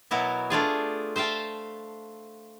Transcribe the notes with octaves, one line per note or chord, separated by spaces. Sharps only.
B2 F#3 B3 E4 A#4
A3 D4 F4 G#4
C5 E5 F5 G5 A5